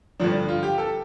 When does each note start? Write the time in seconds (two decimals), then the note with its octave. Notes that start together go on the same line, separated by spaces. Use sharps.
0.20 G2 D3 F3 D4
0.48 F4
0.63 G4
0.78 A4